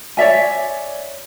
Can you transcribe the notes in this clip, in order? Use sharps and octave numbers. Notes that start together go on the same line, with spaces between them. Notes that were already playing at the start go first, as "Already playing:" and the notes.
C#5 D5 E5 G#5